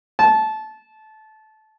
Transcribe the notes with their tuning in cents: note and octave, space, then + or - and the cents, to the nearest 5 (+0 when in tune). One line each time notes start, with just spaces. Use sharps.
A5 -20